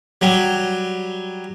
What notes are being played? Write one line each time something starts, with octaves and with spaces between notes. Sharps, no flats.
F#3 G3